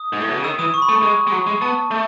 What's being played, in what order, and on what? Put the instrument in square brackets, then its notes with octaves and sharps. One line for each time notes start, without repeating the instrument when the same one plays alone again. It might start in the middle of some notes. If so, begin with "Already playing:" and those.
Already playing: [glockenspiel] D#6
[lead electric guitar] G#2
A2
B2
C#3
[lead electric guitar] D#3 [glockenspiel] E6
[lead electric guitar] E3 [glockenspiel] D#6
[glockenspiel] C#6
B5
[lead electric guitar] A3
[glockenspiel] C#6
[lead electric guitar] G#3
G#3
F#3
G#3
[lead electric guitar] B3 [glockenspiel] A5
[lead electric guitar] A3